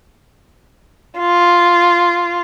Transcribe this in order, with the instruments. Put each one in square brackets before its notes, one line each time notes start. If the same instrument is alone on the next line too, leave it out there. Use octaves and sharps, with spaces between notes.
[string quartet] F4